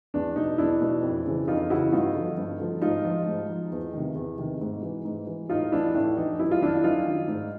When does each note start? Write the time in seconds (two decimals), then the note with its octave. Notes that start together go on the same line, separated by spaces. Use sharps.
0.14 E2 D4
0.36 B2 D#4
0.58 E2 D4 E4
0.81 B2
1.03 F2
1.26 C#3 E3
1.47 F2 D#4 F4
1.70 C#3 E3 E4 F#4
1.92 G2 D#4 F4
2.14 D3 F3
2.37 G2
2.60 D3 F3
2.82 G#2 D#4 F4
3.05 F3
3.26 G#2
3.49 F3
3.71 E2
3.93 C3 D#3
4.15 E2
4.38 C3 D#3
4.61 G#2
4.83 E3
5.05 G#2
5.27 E3
5.49 A2 D#4 F4
5.72 E3 D4 E4
5.95 A2 D4
6.17 E3 D#4
6.39 F#2 E4
6.51 F4
6.61 D#3 D4 E4
6.84 F#2 D#4 F4
7.06 D#3
7.28 G#2